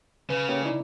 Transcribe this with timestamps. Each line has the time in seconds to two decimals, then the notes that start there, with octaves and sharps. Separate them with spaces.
0.30 C#3 B4
0.48 A#3 C#4 G4
0.64 D#4 E4 D5